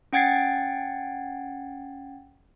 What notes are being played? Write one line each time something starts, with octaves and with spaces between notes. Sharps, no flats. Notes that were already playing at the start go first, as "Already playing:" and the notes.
C#4 F#5 G5 G#6 A6 C7